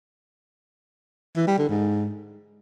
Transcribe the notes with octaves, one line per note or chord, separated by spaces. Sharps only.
E3
G3
D3
G#2